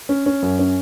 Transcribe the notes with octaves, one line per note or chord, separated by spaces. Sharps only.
C#4
C#4
F#2
C#4